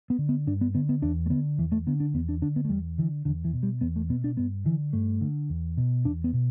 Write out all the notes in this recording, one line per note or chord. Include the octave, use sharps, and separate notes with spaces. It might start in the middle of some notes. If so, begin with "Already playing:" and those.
B3
D3
B3
G2 D4
B3
D3 B3
B3
E2 D4
A3
D3 B3
E2 E3
A3
D3 B3
D4
E2 B3
D4
D3 D4
B3
A3
E2 G3
D3 E3
E2 D3
E3
B2
G3
E2 B3
A3
B2 B3
D4
G2 B3
D3 E3
G2 A3
D3
E2
B2
E2 D4
B3
B2